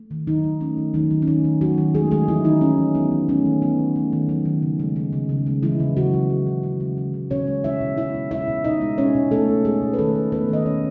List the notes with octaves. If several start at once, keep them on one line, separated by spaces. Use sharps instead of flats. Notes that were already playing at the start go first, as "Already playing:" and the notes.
Already playing: A3
D#3
D#3 F#3 D#4
D#3
A3 C#4
D#3
D#3 F#3 D#4
D#3
C#4
D#3 A3 D#4
D#3
F#3 F#4
D#3
G#3 A3 G#4
D#3 G#3 G#4
E3 F#3 E4
D#3 D#4
A3 C#4
D#3
F#3 B3
D#3
A3 C#4
D#3
F#3 B3
D#3
A3
D#3
F#3
D#3
C#3
G#3
G#3
C#3
C#3
G#3
E3 G#3 E4
C#3
C#3 F#3 F#4
G#3
G#3
C#3
C#3
G#3
G#3
C#3
B2 C#4 C#5
G#3
G#3 E4 E5
B2
B2 E4 E5
G#3
G#3 E4 E5
B2
B2 D#4 D#5
G#3
G#3 C#4 C#5
B2
B2 A3 A4
G#3
G#3 G#4
B2
B4
D#3 A3 A4
A3
A3 B3 B4
D#3 D#5
D#3 C#4 C#5